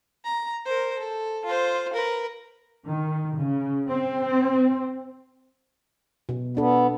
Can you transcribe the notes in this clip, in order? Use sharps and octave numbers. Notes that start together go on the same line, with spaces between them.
A#5
A#4 C5
A4
F4 C5
A#4 B4
D#3
C#3
C4
B2
B3 D4 A4